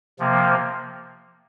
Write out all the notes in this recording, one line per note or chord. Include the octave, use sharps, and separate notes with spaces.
C3 F3 A#3